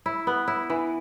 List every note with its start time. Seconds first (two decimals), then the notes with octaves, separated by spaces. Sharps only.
0.06 E4
0.27 B3
0.48 E4
0.70 E3